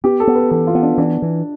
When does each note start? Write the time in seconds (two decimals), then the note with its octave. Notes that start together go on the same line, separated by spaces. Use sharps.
0.04 B3 G4
0.20 A4
0.27 B3
0.35 B4
0.51 E3 A4
0.67 F4
0.75 B3
0.83 D4
0.97 E3 D4
1.22 E3